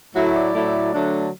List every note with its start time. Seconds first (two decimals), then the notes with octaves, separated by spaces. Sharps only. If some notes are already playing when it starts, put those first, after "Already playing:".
0.14 A2 F#3 A3 E4 F#4
0.34 D5
0.54 A2 F#3 A3 E4
0.93 D3 F#3 A3 D4